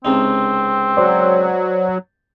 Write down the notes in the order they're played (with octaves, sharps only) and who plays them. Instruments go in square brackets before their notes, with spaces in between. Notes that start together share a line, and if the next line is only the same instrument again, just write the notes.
[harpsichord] C#2 C3 D#4 [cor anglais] C4
[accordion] F#3 [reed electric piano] C5 D5